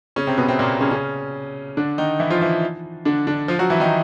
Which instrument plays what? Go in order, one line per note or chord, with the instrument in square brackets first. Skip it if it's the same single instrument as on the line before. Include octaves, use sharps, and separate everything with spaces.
[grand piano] C#3 C#4
C3 C4
B2 B3
C3 C4
A#2 A#3
C#3 C#4
C#3 C#4
D3 D4
D#3 D#4
E3 E4
F3 F4
E3 E4
D3 D4
D3 D4
F3 F4
F#3 F#4
E3 E4
D#3 D#4